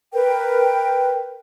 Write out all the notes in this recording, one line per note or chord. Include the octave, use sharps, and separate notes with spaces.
A#4 B4 G5